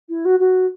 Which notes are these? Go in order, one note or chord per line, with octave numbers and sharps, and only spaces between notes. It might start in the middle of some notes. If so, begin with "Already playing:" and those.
E4
F#4
F#4